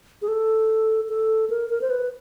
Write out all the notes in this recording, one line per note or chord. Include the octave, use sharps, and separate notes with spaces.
G#4
A4
A4
A#4
A#4
C5
B4